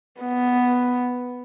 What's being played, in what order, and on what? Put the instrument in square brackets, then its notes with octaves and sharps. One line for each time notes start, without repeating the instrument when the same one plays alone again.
[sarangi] B3